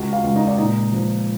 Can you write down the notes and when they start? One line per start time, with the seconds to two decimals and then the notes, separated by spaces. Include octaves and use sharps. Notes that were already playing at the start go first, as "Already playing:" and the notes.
Already playing: C#2 F#4 F#5
0.13 F4 F5
0.24 C#2
0.36 D#4 D#5
0.47 D5
0.58 A#2 D#4 D#5
0.93 F3